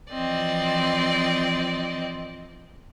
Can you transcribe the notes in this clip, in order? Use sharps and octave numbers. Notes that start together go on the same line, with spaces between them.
E3 F3 C4 D5 D#5